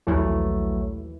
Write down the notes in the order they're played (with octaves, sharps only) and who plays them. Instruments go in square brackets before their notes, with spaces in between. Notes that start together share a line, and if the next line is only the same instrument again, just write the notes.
[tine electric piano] A#1 F#3 A3 [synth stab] D#2 E3